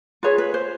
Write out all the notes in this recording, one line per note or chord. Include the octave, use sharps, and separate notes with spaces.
F4 G#4 B4 C#5
B4
C5